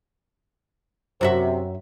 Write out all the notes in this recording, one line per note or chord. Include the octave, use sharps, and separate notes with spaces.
F#2 C3 F#4 E5